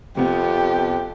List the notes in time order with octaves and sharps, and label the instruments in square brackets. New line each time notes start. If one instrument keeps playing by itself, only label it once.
[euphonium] F2 [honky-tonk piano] C3 B3 [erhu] G4